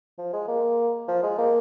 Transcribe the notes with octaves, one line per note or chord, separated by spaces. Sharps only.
F3
G#3
A#3
F3
G#3
A#3